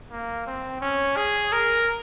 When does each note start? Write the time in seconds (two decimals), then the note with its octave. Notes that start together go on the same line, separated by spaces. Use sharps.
0.11 A#3
0.47 C4
0.81 C#4
1.17 G#4
1.53 A#4